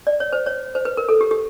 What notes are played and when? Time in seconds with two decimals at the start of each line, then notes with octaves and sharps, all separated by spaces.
0.07 D5
0.20 C#5
0.33 C5
0.46 C#5
0.75 C5
0.85 B4
0.97 A#4
1.09 A4
1.21 G4
1.31 G4